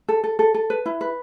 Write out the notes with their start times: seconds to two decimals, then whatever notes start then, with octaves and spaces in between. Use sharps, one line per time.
0.09 A4
0.24 A4
0.39 A4
0.54 A4
0.70 B4
0.86 E4
1.01 B4